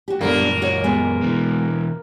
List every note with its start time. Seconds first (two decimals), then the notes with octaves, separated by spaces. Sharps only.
0.08 F#4 G4
0.21 F#2 A#2 D3 G3 A#3 B3
0.62 F#4 C#5 D#5
0.84 G#3 B3 F#4
1.21 B2 E3